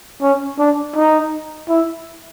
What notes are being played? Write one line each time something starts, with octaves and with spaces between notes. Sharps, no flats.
C#4
D4
D#4
E4